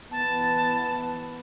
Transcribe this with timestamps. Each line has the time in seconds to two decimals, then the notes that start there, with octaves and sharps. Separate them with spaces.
0.11 E3 B3 A5